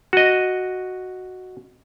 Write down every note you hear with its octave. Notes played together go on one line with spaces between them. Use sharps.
F#4 D#5